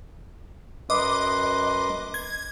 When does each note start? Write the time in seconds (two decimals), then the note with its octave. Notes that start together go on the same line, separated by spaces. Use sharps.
0.90 F#2 B4 D#5 C6 D6
2.14 G#6